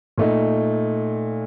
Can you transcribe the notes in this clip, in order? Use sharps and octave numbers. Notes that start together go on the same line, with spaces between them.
A#2 A3 D#4